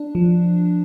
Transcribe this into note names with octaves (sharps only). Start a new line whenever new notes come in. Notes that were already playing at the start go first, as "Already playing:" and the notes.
Already playing: D4
F3